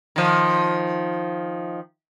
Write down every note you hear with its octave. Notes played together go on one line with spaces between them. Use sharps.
D#3 F3